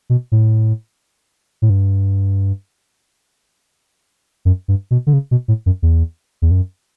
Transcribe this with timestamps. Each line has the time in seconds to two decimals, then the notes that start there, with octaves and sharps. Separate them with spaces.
0.10 B2
0.32 A2
1.62 A2
1.70 G2
4.45 F#2
4.68 G2
4.91 B2
5.07 D3
5.13 C#3
5.31 B2
5.48 A2
5.66 F#2
5.82 E2
6.42 E2
6.51 F#2